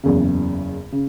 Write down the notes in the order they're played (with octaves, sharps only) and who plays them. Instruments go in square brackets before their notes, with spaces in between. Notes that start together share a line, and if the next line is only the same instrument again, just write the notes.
[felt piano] F#1 E2 C#3
C#3